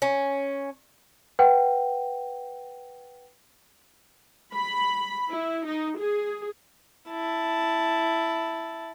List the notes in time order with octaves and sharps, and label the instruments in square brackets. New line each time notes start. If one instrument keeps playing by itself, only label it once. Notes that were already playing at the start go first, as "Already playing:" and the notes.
[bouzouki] C#4
[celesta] B4 F#5 G5
[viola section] B5
E4
D#4
G#4
[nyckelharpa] E4 A5